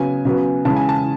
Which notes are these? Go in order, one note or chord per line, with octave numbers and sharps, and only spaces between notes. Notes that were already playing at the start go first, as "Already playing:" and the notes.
Already playing: C#3 F#3 B3 G#5
C#3 F#3 B3
C#3 E3 G#3 A5
G#5
A5